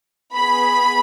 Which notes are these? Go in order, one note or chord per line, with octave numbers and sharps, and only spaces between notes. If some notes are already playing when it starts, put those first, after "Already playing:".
B3 G#4 B5